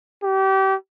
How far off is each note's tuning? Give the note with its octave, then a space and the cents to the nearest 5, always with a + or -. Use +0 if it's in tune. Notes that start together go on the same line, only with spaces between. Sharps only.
G4 -30